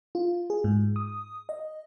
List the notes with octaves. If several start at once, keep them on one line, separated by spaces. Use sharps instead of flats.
F4
G#4
G#2
D#6
D#5